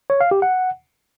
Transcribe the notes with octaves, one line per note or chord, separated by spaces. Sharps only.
C#5
F5
G4
F#5